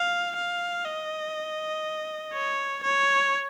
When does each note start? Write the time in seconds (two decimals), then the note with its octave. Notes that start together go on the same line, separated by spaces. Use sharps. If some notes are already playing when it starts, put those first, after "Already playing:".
Already playing: F5
0.36 F5
0.85 D#5
2.33 C#5
2.83 C#5